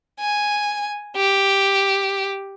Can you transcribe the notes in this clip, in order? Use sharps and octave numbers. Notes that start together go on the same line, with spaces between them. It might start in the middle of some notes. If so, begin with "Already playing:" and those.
G#5
G4